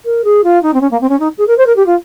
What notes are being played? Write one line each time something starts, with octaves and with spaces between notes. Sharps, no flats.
A#4
G#4
F4
D#4
C4
C#4
A#3
C4
C#4
D#4
G#4
A#4
C5
A#4
G4
F4